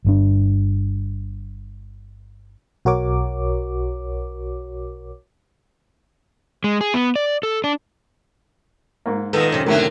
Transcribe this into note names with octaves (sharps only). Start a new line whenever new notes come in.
G1 G2 D4
B1 F#4 A#4 C#5 D6
G#3
G#4
B3
D5
A4
D4
G#2 A#3
A#2 D#3 B3 A4 A#6
F#2 C3
A2 D3 D#3 F#3 A3 A#4